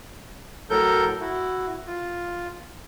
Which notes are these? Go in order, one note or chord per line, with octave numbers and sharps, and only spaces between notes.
A2 F#3 A4 A#4 G6
E4 F#4
F4